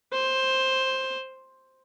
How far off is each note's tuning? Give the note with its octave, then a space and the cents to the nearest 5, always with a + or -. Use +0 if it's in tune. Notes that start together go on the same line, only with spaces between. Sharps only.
C5 +10